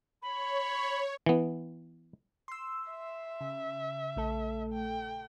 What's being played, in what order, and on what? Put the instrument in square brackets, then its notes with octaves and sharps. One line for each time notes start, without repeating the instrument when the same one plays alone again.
[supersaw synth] C#5 [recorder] B5
[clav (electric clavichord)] E3 B3
[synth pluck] C6 E6
[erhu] E5
[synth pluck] C#3
A#1 A3 A4
[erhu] G5